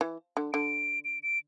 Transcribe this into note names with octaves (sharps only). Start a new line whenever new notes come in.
E3
D3
D3 D7
D7
D7